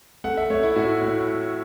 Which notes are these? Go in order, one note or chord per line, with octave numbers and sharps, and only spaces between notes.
A3 F#5
E5
A3 C#5
E4
A2 F#4
A2